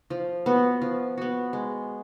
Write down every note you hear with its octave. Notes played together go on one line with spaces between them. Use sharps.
F3
B3 F#4
F3
B3 F#4
G#3